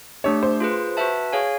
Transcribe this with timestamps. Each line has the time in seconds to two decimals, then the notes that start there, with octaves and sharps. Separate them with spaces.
0.24 A3 D4 G4 C#5
0.43 C5
0.60 F4 G#4 B4
0.97 F#4 B4 E5 A5
1.33 G#4 C#5 F5 G#5